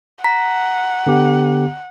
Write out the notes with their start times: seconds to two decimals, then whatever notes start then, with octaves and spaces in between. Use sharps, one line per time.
0.24 F#5 A#5 B6
1.07 D3 B3 G4